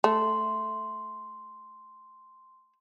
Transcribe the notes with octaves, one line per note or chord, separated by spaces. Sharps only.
A3 C6